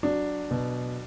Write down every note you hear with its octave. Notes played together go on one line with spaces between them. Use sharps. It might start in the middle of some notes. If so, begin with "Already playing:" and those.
F#3 D4
B2